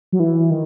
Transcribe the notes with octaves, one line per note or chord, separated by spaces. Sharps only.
F#3
E3
D#3